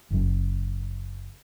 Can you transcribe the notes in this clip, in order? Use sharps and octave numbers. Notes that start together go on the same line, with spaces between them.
F#1 F#2